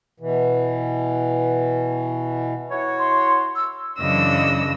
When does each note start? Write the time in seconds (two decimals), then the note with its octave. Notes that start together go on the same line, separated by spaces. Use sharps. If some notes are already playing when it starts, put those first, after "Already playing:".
0.20 B2 E3
2.70 E4 F#4 C#5
2.99 C6
3.56 E6
3.99 F#2 C#3 E3 D4 D#5 E6